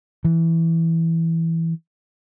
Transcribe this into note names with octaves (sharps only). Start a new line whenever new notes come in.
E3